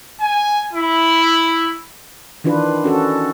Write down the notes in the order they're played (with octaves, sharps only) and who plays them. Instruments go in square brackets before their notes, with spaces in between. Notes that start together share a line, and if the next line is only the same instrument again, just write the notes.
[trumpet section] G#5
E4
[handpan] D#3 E3 D4 F4 B4
C#4 F#4 A4